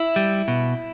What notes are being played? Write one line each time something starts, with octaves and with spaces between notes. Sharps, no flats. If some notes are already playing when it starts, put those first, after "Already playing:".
Already playing: E4
G3
B2